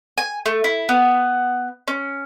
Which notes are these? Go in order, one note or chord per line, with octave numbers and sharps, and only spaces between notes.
G#5
A3
E4
B3
C#4